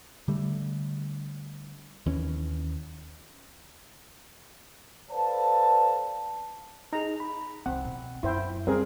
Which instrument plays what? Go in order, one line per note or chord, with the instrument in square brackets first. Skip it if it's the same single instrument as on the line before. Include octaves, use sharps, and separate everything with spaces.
[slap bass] D3 G3 A3
D#2 E3 C#4
[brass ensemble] A4 B4 C5 D5 F5 A5
[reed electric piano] D#4 G#4 [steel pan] A#5
[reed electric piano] B5
[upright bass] C2 [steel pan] C4 [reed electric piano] F#5
[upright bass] B2
[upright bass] F#2 [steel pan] E4 C5 G5
[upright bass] C3 [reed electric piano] G3 [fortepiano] C4 G#4 [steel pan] A#4